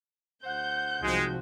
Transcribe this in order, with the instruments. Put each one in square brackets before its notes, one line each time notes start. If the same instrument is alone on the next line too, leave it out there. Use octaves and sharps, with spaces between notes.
[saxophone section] D2 C5 F#5 [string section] G6
[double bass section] C2 F3 C4 [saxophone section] G#2 F#4 [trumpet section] G#3